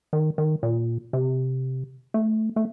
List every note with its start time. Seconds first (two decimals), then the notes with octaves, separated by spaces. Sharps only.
0.13 D#3
0.38 D#3
0.63 A#2
1.13 C3
2.14 A3
2.56 A3